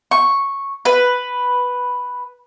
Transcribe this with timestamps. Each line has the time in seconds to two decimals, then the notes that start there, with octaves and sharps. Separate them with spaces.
0.11 C#6
0.85 B4